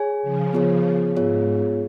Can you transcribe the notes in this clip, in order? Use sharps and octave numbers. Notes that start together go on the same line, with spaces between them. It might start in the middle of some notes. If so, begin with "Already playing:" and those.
Already playing: G#4 C#5 G#5
C#3 F3
B3 F4 G#4 C#5
G#2 B3 F4 G#4 C#5